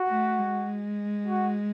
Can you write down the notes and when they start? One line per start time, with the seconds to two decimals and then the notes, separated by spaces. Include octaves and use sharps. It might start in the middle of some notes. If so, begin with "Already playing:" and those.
Already playing: F#4
0.09 A3
0.39 G#3
1.27 F#4